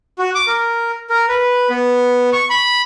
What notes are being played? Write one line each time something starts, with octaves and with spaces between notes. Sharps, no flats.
F#4
D6
A#4
A#4
B4
B3
C#6
B5